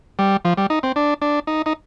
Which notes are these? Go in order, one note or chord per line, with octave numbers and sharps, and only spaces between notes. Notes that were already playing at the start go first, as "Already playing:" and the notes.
G3
F3
G3
D#4
C4
D4
D4
D#4
D#4